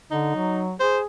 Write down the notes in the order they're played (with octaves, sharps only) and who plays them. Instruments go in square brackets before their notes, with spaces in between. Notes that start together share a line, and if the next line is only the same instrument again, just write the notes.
[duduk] D3 [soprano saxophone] D#4
[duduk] F#3
[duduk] G#4 [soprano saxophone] C5